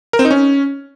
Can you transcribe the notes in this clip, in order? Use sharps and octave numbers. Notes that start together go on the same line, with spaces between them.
A#4
C4
D#4
C#4